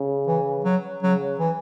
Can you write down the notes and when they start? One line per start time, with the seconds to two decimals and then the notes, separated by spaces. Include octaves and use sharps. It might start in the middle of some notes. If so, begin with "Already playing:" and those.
Already playing: C#3
0.27 E3
0.64 F#3
1.02 C#3 F#3
1.39 E3